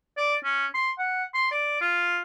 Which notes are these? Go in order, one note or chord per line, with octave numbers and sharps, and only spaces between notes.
D5
C#4
C6
F#5
C6
D5
F4